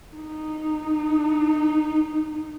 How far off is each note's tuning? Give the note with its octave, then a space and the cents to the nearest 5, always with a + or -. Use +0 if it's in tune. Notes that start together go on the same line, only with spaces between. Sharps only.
D#4 -15